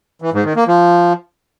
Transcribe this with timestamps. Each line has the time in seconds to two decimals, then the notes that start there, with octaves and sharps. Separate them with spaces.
0.22 E3
0.33 G#2
0.45 D#3
0.56 A#3
0.68 F3